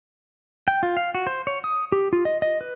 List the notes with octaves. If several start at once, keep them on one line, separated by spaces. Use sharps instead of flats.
G5
F4
F5
F#4
C5
C#5
D#6
G4
F4
D#5
D#5
B4